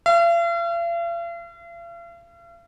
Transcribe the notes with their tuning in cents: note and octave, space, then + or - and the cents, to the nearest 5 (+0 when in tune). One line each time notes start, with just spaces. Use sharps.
F5 -45